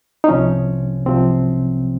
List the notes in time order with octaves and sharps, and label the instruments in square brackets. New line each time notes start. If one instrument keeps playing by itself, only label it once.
[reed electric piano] D#4
C2 C3 F3 C#4
C2 C3 F3 C4